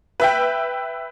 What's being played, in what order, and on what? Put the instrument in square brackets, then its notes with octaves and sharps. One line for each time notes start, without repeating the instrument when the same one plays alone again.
[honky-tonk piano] B4 E5 G5